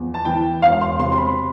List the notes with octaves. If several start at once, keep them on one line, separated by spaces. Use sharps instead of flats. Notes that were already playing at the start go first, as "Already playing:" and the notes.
Already playing: E2 F3
A5
E3 G5
E1 F5
C6
C3 C6
C6
B5